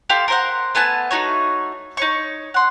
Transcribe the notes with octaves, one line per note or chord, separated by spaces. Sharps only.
G4 A4 F5 C6
A#4 C5 F#5
A3 B3 G#5 A5
A3 D#4 F#4 C#5
D#4 C#5 C#6
F#5 C6